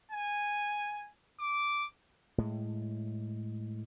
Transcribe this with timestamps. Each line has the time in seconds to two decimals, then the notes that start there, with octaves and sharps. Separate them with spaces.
0.11 G#5
1.40 D6
2.38 A2 G#3